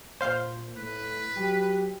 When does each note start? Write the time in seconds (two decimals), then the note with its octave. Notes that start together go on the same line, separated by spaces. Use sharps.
0.21 A#2 C5 F5 G6
0.77 A2 B4
1.36 F#3 G4